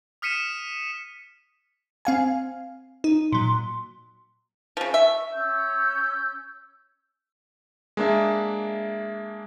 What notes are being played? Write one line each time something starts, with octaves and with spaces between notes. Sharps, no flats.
D#6 F6 B6 C#7 D#7 E7
C4 F5 G#5
D#4
A#2 F#3 C6
C#3 F3
E5 C#6
C#4 E6 G6
G#3 A#3 D4 E5